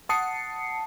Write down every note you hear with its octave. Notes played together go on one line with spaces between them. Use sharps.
F#5 A5 D#6 C7 C#7